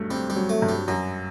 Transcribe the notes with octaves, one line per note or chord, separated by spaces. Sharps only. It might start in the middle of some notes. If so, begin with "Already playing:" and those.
Already playing: G2 F#3 A3
G3 C4
G3
F#3
A3
G2
G3
F#2 F#3